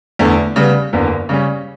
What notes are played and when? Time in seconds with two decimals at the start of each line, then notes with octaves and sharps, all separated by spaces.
0.19 E2 D3 A3
0.56 C#3 G3 B3
0.93 F#1 E2 D3
1.29 C#3 G3 C#4